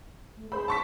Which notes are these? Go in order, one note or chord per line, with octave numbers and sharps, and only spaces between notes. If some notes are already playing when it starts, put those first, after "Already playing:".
A3
G#4 C5 B5
A5 C#6 B6